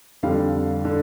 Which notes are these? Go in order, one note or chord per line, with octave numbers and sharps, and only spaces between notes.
F2 D3 G3 F5
D3